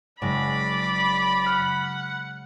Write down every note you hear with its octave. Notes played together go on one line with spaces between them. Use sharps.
F#1 G#3 D5 B5 A#6
F#5 F6